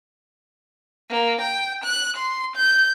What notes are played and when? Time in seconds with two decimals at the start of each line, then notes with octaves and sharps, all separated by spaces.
1.10 A#3
1.41 G5
1.84 F#6
2.17 C6
2.56 G6